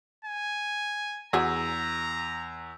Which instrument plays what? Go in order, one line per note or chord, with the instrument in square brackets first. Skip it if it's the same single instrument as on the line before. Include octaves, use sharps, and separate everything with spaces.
[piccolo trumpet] G#5
[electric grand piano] E2 [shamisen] F#4 G#4 [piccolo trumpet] A#5 [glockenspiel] E6